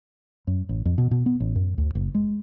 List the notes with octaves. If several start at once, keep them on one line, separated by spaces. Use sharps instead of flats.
F#2
A1
F2
B2
B2
B3
A1
F#2
D2
F#1
G#3